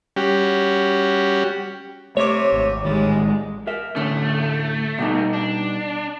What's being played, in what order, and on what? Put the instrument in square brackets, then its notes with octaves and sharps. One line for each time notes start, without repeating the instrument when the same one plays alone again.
[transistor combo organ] G3 C#4 F#4 G4
[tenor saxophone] C3 [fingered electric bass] A3 [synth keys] C#5 D6
[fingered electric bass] G#1
[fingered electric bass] A1 D#3 [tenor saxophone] G3 [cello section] G#3
[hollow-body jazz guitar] A#4 E5
[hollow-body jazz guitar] A2 D3 C#4 [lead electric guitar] A3
[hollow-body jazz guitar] B2 G3 D#4
[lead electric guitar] D4